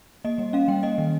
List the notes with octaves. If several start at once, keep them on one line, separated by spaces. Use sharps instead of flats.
A#3 D#5
G3
C#4 F5
G3 G5
A#3 D#5
D#3